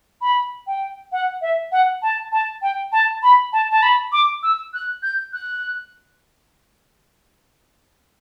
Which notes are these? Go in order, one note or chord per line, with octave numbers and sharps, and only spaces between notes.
B5
G5
F#5
E5
F#5
A5
A5
G5
A5
B5
A5
A5
B5
D6
E6
F#6
G6
F#6